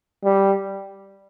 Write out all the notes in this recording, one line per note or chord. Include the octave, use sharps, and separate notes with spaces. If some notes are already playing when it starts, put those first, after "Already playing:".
G3